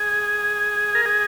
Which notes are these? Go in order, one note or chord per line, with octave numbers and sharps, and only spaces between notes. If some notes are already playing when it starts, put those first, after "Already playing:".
Already playing: G#4
A#4
G#4